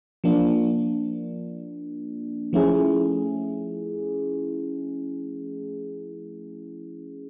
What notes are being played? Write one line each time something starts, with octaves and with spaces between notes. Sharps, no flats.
F3 A#3 D4
F3 A3 C#4 E4 G#4